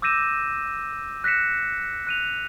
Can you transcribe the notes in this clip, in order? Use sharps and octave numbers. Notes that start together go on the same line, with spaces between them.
D6 E6 G6 A#6 D#7 E7
F#6 A#6 B6 C#7 E7
F#6 D#7 F7